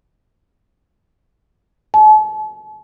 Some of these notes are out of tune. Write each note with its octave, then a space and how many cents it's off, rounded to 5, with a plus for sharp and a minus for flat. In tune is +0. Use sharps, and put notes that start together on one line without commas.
A5 -45